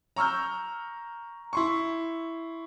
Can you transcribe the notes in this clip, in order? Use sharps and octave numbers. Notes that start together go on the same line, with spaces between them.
A#5 C#6 E6 F6 G6
E4 C6 C#6